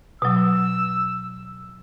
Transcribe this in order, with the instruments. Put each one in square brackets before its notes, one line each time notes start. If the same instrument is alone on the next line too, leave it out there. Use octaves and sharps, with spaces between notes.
[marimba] B2 F#3 [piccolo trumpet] E6